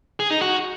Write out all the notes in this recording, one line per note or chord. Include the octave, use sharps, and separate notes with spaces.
G#4
D#4
F#4